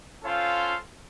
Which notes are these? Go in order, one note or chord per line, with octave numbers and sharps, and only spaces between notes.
C#4 F4 A4 C5 F5